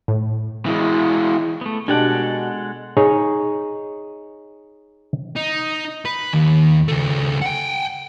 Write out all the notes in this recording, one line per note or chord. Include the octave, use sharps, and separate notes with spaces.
A2
E3 G#3
A3 B3
B2 G#3 D4 G4 A4 F#5 G5
D#4 G#4 C#5 D#5
D#4
B4
D#2
C#2 A3
F#5 G5